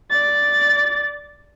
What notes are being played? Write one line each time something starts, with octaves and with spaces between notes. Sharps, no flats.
D5 A6